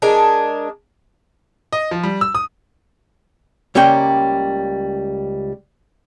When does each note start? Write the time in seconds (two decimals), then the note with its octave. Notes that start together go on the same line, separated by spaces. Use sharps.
0.02 G#3 D4 A#4
1.73 D#5
1.91 F3
2.03 G3
2.21 E6
2.35 D#6
3.75 C#2 G3 A#3 C#4 G5